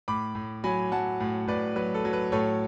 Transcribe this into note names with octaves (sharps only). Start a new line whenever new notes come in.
A2 B5 D6
A2
F#3 G#5 B5
F#3 F#5 A5
A2
A2 B4 D5
F#3 B4
A4
F#3
B4
A2 A4 C#5